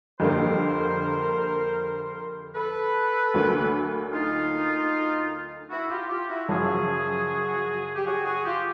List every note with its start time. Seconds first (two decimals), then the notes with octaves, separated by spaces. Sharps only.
0.20 F2 D3 G3 A#3 A#4 C5
2.55 A4 B4
3.34 D2 D3 F#3 A#3
4.12 D#4 F4
5.69 E4 F#4
5.89 F4 G4
6.09 F4 G4
6.28 E4 F#4
6.48 F#2 C#3 F3 F#4 G#4
7.95 G4
8.04 F#4 G#4
8.25 F#4 G#4
8.44 F4 G4